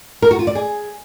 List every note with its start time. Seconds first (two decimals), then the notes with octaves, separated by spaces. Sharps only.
0.22 A#4
0.31 F#4
0.39 F4
0.47 D5
0.55 G#4